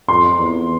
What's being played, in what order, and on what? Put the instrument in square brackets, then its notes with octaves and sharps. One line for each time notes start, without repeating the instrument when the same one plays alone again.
[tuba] F2 [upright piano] C6
[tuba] E2